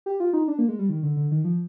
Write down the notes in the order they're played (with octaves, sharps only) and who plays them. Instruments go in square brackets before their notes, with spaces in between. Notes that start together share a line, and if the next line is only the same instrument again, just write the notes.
[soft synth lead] G4
F4
D#4
D4
A#3
G#3
G3
D#3
D3
D3
D#3
F3